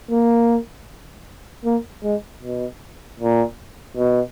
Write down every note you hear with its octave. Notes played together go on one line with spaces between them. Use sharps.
A#3
A#3
G#3
B2
A#2
B2